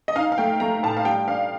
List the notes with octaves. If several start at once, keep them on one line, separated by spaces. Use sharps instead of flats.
D#5
D#4 F5
F5
A3 G5
A3 A#5
A2 A5
F5
G3 G5
D4 F5